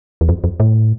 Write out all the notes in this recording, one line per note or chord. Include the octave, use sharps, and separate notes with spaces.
E2
F2
F2
A2